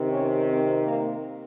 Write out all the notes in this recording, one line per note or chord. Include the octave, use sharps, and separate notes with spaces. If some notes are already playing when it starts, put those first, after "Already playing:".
Already playing: C3 D#3
C#4
C4
A#3